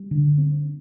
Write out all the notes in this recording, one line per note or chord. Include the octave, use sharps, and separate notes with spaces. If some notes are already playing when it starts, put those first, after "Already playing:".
Already playing: G3
D3
C4